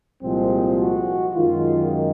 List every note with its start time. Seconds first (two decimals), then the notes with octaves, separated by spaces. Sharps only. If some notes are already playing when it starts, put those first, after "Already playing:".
0.23 C2 A#2 F3 G#3 C4
0.78 F#4
1.34 F#2 D#3 G#3 F4